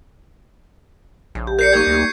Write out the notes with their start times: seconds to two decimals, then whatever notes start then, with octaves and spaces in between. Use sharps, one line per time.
1.35 A#1 C#3
1.47 G4
1.59 A#4 D5 G6 C7 C#7
1.73 G3 A#3 D#4 C#6 G6 G#6
1.87 D2